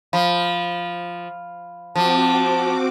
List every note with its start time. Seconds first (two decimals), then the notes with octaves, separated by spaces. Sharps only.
0.13 F3 F5 B5
1.96 F3 C4 F#4 A5 D6